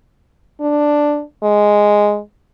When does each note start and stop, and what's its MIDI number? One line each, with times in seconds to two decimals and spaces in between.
0.60 1.22 62
1.43 2.19 56